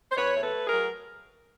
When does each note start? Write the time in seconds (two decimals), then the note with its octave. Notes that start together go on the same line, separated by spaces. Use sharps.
0.11 C5
0.17 E2 B4 C#5
0.36 A3
0.42 A4 B4
0.54 A3
0.67 G#4 A#4
0.73 F#3